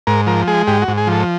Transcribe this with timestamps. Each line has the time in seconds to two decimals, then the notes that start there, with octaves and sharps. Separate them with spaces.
0.07 G#2 A#4
0.27 F3 A#4
0.48 G#3 G#4
0.67 G#2 G4
0.82 F#4
0.88 G#2
0.98 G#4
1.07 F3
1.12 A4